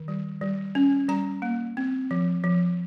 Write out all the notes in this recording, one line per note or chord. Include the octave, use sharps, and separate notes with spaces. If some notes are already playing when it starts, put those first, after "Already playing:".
Already playing: D#3
G3
G3
C#4
G3 A#5
A#3
C4
F3
F3